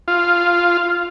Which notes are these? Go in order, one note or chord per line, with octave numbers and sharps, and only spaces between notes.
F4